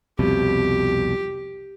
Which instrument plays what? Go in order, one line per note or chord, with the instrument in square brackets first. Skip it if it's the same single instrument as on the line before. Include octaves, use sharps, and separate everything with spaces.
[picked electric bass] C2 F2 B2 [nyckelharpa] G4